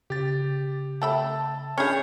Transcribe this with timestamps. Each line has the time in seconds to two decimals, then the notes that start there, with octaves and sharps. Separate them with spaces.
0.10 C#3 G4 A6
1.02 A3 G5 A5 B5 E6
1.78 C#4 D4 G#4 C#5 B5 F6 G6 C#7